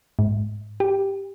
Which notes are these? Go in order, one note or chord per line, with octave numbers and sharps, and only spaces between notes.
G#2
G4